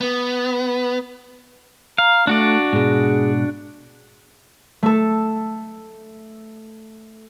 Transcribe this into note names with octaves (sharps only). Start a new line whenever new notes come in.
B3
F5 A#5
A3 D4 F#4 D5
G#2 B2 G#4
A3 A4